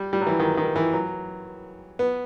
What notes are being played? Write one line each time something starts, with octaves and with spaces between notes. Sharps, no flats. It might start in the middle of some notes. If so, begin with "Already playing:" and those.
Already playing: G3
G3
F#3
E3
D#3
D#3
E3
F#3
B3